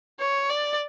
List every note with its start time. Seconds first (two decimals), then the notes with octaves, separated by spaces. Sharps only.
0.20 C#5
0.49 D5